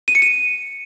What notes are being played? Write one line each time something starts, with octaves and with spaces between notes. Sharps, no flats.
D#7
C#7
D#7